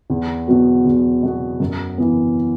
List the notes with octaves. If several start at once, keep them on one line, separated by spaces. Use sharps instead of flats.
E2
B2 F#3 B3 F#4
E2
B2 F#3 B3 F#4
F#2
E3 B3